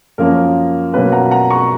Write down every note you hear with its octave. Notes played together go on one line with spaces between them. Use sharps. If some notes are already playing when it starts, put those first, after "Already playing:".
F#2 F3 A#3 C#4 F4 A#4
B2 F#3 A#3 C#4 F4 B4
F#5 A#5
F#5 A#5
A#5 C#6